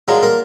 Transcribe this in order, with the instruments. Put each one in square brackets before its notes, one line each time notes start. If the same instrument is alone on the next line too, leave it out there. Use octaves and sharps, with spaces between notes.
[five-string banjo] F#3 D4 F4 A#4 [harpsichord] G#3
[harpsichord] A#3